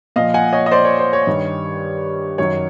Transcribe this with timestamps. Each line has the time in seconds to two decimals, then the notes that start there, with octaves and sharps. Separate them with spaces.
0.16 A#2 F3 D#5 F5
0.34 F#5 G#5
0.53 C#5 D#5
0.66 D#5
0.71 C5 D5
0.85 C#5
0.99 C5
1.13 C#5
1.27 G2 D#3 G3
2.38 F#2 D#3 F#3 C#5